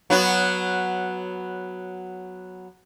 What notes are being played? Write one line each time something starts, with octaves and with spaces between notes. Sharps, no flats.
F#3 B3 F#4